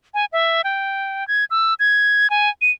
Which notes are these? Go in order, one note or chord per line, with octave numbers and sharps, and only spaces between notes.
G#5
E5
G5
G#6
E6
G#6
G#5
D#7